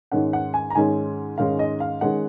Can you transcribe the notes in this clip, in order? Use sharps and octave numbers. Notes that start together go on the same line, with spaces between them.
G#2 D#3 G#3 C#4 F#5
F#5
G#5
A#5
G#2 D#3 G#3 C#4 G#5
G#2 D#3 G#3 C#4 F5
D#5
F5
D#3 G#3 C#4 F#5